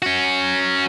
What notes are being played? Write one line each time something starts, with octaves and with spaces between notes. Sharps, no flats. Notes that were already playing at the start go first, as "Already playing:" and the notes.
C#4 F#4